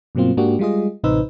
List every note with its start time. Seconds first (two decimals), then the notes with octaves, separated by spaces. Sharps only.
0.15 G2 B2 F#3 A#3 C4 F4
0.37 G#2 A#3 D4 F#4 G4
0.59 G3 G#3 F4 G#4 D#5
1.04 A1 C3 D#4 B4 C5 E6